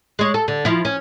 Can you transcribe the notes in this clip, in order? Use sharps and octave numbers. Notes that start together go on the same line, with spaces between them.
G#3 C#5
A4
D3
F3 E4
C#4